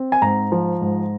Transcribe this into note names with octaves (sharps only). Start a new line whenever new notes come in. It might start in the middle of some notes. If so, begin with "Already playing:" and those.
Already playing: C4
G#5
G#2 A#5
F3
G#2